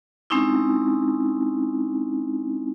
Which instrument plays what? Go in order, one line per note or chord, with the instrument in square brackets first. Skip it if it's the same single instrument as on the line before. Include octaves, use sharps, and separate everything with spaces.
[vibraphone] G#3 C4 C#4 D#4 E4